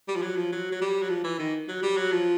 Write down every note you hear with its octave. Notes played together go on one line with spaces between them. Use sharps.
G3
F3
F#3
F3
F#3
F#3
G3
F#3
F3
E3
D#3
F#3
G3
F#3
F3